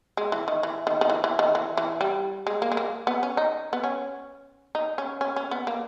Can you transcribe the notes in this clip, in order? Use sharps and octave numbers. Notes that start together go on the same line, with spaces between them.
G#3
E3
D#3
E3
D#3
D#3
E3
E3
D#3
E3
E3
G3
G#3
A#3
G#3
A#3
B3
C#4
D#4
B3
C#4
D#4
C#4
C#4
C#4
B3
A#3